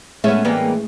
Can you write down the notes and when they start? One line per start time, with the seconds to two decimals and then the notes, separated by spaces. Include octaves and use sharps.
0.24 A2 G#3 A3 B3 C#4 C#5 E5
0.45 E3 G3 A#3 B3 C#4